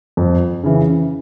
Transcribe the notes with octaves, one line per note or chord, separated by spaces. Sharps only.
F2
C#3 E3